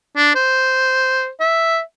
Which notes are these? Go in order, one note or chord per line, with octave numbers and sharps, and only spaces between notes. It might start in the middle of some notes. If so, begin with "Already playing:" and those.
D4
C5
E5